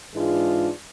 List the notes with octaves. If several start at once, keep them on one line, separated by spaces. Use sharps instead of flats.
G#2 E3 G#3 D4 F4